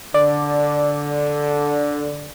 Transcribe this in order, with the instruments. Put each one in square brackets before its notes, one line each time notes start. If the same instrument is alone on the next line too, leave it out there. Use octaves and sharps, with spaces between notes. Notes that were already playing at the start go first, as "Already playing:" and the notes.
[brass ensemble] D3 [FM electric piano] D5